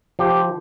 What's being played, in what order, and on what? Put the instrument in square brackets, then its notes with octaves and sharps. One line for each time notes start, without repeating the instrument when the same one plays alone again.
[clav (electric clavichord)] F3 G4